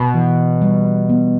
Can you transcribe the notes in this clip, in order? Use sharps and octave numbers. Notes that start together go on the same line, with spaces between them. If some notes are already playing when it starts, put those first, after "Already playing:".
Already playing: B2
E3
G3
B3